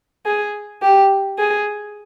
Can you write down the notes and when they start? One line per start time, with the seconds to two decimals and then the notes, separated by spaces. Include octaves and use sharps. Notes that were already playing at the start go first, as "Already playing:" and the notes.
0.26 G#4
0.82 G4
1.38 G#4